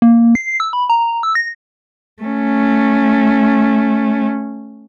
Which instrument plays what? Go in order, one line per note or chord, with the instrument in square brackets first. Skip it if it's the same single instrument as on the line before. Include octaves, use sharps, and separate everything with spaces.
[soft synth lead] A#3
C7
E6
B5
A#5
E6
A#6
[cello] A3 C#4